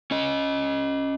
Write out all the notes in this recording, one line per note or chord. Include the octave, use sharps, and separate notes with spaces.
C#4 D#5